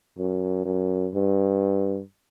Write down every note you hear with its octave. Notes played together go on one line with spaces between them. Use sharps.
F#2
F#2
G2